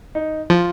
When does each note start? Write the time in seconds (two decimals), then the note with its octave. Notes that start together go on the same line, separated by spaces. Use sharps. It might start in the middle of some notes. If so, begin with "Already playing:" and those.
0.15 D#4
0.50 F3 F4